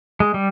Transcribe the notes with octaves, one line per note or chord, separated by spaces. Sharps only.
G#3
G3